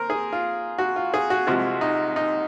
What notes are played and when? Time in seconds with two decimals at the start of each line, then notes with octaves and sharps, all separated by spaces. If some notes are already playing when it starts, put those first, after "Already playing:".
Already playing: D#2 A#4 C5
0.10 G#4
0.33 F4
0.78 F#4
0.96 F4
1.14 G#4
1.30 F#4
1.47 C2 C3 F3 G#3 F#4
1.81 D#4
2.16 D#4